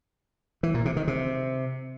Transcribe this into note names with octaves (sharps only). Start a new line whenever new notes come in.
E3
A#2
C3
D#3
C3